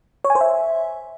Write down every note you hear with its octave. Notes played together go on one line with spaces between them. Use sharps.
C#5
G#5
C5
E5